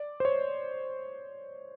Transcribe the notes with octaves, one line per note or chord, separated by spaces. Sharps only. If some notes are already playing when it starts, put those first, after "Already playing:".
Already playing: D5
C5
C#5